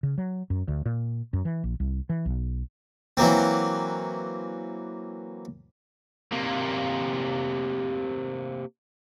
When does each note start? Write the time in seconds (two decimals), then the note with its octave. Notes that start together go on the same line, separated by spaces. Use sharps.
0.03 C#3
0.18 F#3
0.50 F#2
0.68 D2
0.86 A#2
1.33 F#2
1.45 E3
1.64 A#1
1.80 C2
2.09 E3
2.26 B1
3.17 E3 F#3 A#3 C4
6.32 C3 A#3